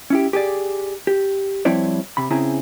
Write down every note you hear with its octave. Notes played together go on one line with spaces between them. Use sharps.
C#4 E4 G4
G4 G#4 D5
G4
F3 G3 C4 E4 C#5 D5
C3 B5
C#3 C4 E4 G#4 A#5